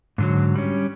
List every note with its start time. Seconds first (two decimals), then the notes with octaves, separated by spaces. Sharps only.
0.18 G#2 D3 F#3
0.56 G3 C#4